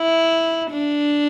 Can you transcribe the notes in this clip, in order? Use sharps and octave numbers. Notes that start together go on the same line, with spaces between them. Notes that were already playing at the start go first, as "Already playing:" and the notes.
Already playing: E4
D4